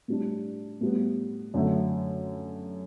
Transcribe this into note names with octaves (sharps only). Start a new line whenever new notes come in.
A2 G3 D4
A2 G3 B3
F#2 D3 A3